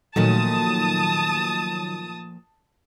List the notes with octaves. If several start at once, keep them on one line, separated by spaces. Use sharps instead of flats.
A#2 D#3 F3 F#3 A3 A5 D#6